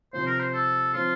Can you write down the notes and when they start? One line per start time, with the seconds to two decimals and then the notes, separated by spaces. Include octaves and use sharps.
0.13 C3 F3 C4 C5
0.27 A#4
0.39 C5
0.54 A4
0.93 F3 C4 F4